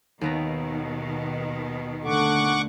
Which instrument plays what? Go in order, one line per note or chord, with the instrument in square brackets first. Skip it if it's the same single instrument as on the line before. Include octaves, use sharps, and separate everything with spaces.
[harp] D#2 B3 A#5 [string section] B2 D#3
[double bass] D3 A3 [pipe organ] F#5 C#6 D6